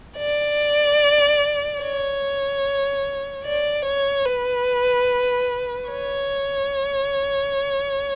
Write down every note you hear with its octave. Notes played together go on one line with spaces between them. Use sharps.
D5
C#5
D5
C#5
B4
C#5